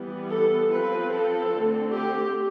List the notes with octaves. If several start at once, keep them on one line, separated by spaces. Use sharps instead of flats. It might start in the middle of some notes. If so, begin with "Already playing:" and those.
Already playing: E3 G3 B3
A4
F3 C4 B4
A4
D3 A3 C4
G4